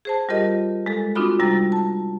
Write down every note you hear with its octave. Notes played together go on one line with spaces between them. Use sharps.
G#4 C5 A5
G3 F4 G4 A#4 D#5
G#3 A4
C4 D4 D#4 F4 F#4 B5
C3 G3 G5 A#5 A6
A5